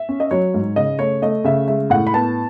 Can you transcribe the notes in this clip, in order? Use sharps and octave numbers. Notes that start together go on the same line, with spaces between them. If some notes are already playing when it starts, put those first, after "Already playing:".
Already playing: E5
C#4
D#5
F#3 C#5
G#2
C#3 D#5
A3 C#5
A3 D#5
C#3 E5
G#3 E5
A2 F#5
B5
B3 A5